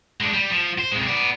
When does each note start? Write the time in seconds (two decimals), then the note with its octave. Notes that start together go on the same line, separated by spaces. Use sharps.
0.20 G#3 D4
0.33 G3
0.50 F3
0.78 C5
0.92 C3 G#3
1.07 B3 D5